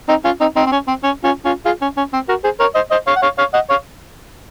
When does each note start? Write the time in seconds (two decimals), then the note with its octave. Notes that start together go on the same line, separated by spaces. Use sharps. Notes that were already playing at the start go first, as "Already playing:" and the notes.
0.08 C4 D#4
0.24 C#4 F4
0.40 C4 D#4
0.56 C4 D#4
0.66 C4
0.72 C#4
0.88 C4
1.03 C#4
1.24 C#4 F4
1.45 C#4 F4
1.65 F4 G#4
1.82 C#4
1.97 C#4
2.13 C4
2.29 F#4 A#4
2.44 G#4 C5
2.60 A#4 C#5
2.75 C5 D#5
2.91 C5 D#5
3.07 C#5 F5
3.16 F#5
3.22 C#5 F5
3.38 C#5 F5
3.54 D#5 F#5
3.69 C#5 F5